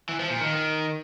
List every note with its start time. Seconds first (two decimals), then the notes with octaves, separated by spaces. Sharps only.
0.09 E3
0.20 F3
0.30 A#2
0.41 D#3